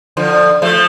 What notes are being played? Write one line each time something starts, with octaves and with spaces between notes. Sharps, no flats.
D3 F3
F3 A3